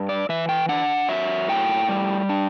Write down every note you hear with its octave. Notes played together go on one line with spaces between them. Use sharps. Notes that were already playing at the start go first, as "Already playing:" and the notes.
Already playing: G2
D5
E3 E5
G5
D4 F#5
F#3 E5
A2 G5
G3
D4